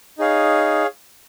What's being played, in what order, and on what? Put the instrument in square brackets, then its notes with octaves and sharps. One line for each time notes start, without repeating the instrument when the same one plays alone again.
[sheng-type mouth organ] D#4 G#4 C#5 F5